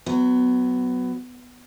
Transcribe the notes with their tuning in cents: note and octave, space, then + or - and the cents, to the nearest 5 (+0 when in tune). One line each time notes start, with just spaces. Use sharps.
F#3 +0 B3 +15